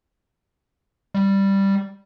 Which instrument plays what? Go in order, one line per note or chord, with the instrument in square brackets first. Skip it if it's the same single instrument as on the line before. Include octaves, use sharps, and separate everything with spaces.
[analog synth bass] G3